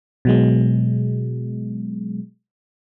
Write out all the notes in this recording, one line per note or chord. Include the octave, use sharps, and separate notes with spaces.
B2 F#3 G#3